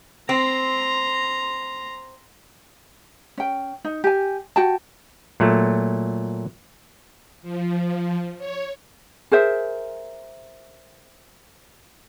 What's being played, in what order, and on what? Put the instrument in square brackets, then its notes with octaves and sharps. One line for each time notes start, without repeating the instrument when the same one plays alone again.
[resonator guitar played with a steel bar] C4 [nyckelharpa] A#5 C6
[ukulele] C#4 G5
D#4
G4 G#5
F#4 G5 A5
[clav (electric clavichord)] A#2 F#3 A3
[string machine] F3
C#5
[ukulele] G#4 A#4 C5 E5